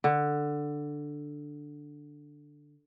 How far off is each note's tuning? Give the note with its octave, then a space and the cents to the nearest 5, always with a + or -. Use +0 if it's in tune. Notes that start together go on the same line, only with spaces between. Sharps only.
D3 +5